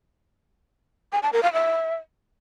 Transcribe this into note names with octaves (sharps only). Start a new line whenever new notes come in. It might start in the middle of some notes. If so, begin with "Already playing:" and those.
G#5
A5
A#4
F5
E5